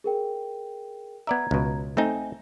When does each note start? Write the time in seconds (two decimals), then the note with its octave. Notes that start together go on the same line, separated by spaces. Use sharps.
0.04 G#4 A#4 G5
1.27 B3 D5 E5 A#5 G#6
1.51 C#2 B2
1.97 A3 C4 D#4 G#5